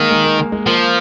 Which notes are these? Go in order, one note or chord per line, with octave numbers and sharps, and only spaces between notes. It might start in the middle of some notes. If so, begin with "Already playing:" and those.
Already playing: D#3 G#3 A#3
G#3
A#3
A#3
G#3
F3 A#3